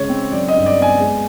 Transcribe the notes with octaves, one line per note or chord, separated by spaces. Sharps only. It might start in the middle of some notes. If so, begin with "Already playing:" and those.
Already playing: C#3 G#3 C#5
C4
F#3 D5
D#5
G2
D5
B3
G#5
G#3